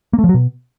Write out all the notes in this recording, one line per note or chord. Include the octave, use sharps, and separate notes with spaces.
A#3
A3
F3
F#3
B2